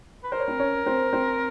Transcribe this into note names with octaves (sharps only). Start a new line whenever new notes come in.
B4
A#4 C5
C#5
C4 C5
C#4 C#5
C4 C5
C4 C5